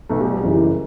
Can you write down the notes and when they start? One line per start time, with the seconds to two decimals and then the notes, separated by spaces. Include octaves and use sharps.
0.09 B1 B2 A3
0.20 G3
0.32 G3
0.43 F#1 F#2 E3 G3